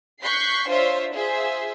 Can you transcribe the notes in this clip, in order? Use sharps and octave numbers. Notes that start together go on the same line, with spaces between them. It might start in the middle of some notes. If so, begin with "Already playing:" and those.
C#6 F#6 G6 B6 C7
D4 F4 C5 C#5 E5
F4 G#4 C5 E5